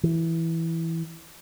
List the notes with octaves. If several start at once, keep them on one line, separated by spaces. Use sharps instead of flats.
E3